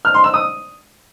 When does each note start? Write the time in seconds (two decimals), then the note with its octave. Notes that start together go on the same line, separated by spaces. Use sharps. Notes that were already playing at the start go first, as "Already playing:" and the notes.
0.05 F6
0.14 C6
0.24 E6
0.34 D#6